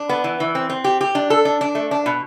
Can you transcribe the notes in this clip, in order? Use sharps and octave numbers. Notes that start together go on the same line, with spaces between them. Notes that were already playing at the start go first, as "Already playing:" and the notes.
Already playing: D4
B3
E3
E3
C4
C4
G4
G4
D4
A4
D4
D4
A3
D4
B2